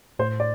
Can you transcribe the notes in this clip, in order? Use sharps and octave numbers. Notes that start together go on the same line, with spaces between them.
A2 C5
D5